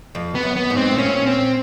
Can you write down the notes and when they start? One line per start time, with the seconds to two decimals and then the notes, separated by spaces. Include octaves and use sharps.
0.15 F2
0.35 B3
0.43 F#2
0.56 B3
0.70 G#2
0.77 C4
0.91 A2
0.98 A#2 C#4
1.26 C4